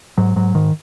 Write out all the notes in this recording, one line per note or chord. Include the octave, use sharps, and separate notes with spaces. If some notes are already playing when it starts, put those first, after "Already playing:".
G#2 F#3
G#2 F#3
G#2 D#3